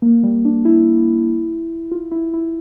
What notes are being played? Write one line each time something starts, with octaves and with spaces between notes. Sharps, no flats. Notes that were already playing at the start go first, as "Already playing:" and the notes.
A#3
G3
D4
E4
F4
E4
E4